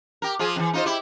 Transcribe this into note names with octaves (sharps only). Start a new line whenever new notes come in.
G4 A#4
F3 F4 G#4
F2 E3
D#4 F4 C5
E4 G4